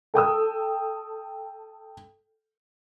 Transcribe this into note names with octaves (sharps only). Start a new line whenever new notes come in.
A4 G5 D#6 E6